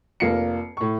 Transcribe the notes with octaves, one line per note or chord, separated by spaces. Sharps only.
F1 A#3 F4 C7 C#7
A2 C#6